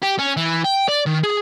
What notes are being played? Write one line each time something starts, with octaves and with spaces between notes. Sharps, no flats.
G4
C#4
E3
G5
D5
D#3
G#4